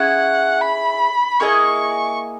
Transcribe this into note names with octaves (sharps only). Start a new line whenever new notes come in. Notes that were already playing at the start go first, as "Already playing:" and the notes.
Already playing: C#4 E4 G#4 F#5
B5
A#3 E4 G#4 D#5 C#6